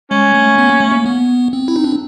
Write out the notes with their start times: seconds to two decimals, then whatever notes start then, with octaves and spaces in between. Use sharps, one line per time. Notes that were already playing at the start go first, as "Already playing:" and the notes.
0.11 G#3 C#4
0.34 A3
0.58 B3
0.69 A#3
0.80 A3
0.92 A#3
1.06 B3
1.53 C4
1.68 E4
1.76 D#4
1.84 D4